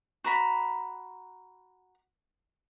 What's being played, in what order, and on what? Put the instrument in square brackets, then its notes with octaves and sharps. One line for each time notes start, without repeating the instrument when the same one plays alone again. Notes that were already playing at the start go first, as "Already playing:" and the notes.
[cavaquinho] F#4 A#5 B5